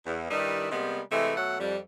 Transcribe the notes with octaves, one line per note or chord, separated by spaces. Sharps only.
E2
G2 D#3 G3 D#4 E4
C3 G3 G#3 A#3 B3
C3 E3 G#3 A3
B2 F#3 A3 A4 F#5
F2 G3